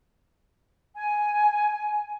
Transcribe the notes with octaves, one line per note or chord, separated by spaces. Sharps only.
G#5